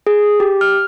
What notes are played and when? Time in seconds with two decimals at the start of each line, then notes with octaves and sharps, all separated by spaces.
0.07 G#4
0.40 G4
0.61 F6